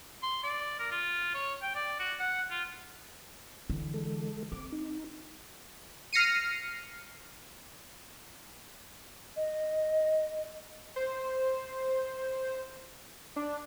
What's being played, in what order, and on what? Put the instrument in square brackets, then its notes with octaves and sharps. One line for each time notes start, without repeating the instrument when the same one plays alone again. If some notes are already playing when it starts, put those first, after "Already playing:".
[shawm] C6
D5
A#4
F4
C#5
G5
D5
F#4
F#5
F4
[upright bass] D3 E3
[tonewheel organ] G#3 A4
[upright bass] C4 [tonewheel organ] D6
[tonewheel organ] D#4
[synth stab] F6 A#6 C7 C#7 D#7
[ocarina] D#5
[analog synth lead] C5
D4